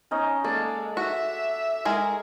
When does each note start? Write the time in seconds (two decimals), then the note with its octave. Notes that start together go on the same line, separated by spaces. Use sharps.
0.11 C#4 D#4 D#5
0.44 G#3 A#3 A4 D5 G#5
0.97 F#4 E5
1.85 G#3 G#4 A#4